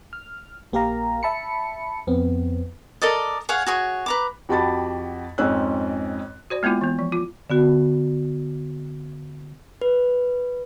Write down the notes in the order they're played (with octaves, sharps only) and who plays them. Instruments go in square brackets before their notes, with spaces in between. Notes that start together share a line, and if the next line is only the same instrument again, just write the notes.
[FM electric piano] F6
A#1 A#3 G4 A#4 F5 A#5
E5 A5 B5 C#7
F2 B3 C4
[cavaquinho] A4 A#4 D5 D#5
G#4 C#5 F5 F#5
F#4 G#4 C#5
B4 A#5 D6
[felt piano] F2 F#4 G4 A5 B5 A6
F2 G#2 C4 C#4 E6 F#6
[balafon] F#4 C5 D5
G#3 A#3 B3 E4 F4
E3 B3
F3
F4
[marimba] D3 B3 F#4
[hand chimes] B4